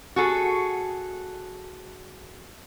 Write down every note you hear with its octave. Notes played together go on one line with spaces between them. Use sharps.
F#4 G#4 A4